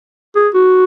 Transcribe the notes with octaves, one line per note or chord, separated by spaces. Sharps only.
G#4
F#4